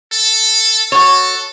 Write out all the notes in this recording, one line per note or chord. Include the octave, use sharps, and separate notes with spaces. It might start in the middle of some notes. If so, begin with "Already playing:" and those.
A4
F#4 A4 C#5